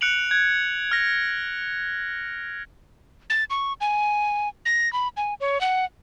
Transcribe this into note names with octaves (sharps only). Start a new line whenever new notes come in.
F#6 C#7 D7 F7 F#7
F#6 G#6
F6 A#6
A6
C#6
G#5
A#6
B5
G#5
C#5
F#5